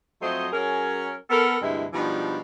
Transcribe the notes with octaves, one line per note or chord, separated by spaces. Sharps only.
F2 F#3 A3 C5 D#5
F#3 C#4 G#4 A#4
B3 A4 A#4
D2 G2 C3 G#3 E4
B2 F3 G3 G#3 D4 D#4